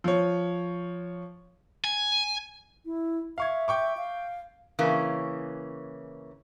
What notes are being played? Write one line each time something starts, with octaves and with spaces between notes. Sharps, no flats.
F3 C#5
G#5
E4
E5 F5 C#6 G#6
G5 C#6 D6
F5
C#3 E3 A#3 C#4